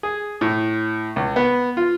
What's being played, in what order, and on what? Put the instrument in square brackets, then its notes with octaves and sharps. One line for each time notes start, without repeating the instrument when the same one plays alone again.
[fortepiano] G#4
A2
C#2
B3
F4